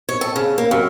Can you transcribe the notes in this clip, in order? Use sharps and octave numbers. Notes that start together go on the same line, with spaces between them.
C#5
A4
C#3
A#3
F#2